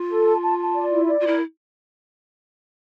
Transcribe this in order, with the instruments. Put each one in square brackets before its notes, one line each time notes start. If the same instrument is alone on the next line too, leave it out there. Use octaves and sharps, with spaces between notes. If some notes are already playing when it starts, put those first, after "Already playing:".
Already playing: [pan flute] F4
[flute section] A4
A5
A5
A5
D5
E4
D5
[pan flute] F4
[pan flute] E4 [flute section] A#4